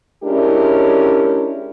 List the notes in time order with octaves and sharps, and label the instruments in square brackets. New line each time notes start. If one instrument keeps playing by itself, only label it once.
[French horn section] G#3 C#4 D4 E4 G4 A#4